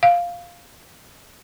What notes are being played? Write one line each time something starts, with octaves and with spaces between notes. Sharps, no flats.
F5